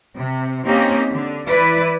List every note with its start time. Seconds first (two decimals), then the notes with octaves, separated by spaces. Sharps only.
0.15 C3
0.65 A#3 C4 C#4 D#4 G4
1.10 D3
1.46 E3 E4 B4 D5